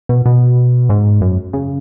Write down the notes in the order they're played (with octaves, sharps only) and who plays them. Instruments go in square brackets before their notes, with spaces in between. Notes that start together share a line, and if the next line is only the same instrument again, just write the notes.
[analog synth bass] B2
B2
G#2
F#2
C#3